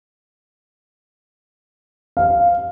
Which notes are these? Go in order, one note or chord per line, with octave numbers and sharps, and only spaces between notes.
F5